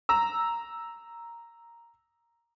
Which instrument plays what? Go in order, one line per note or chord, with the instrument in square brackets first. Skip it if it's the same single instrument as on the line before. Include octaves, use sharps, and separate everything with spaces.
[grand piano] A#5 E6